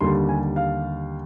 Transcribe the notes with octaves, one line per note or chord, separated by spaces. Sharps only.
D#2 D3 G3 C6
G#5
F5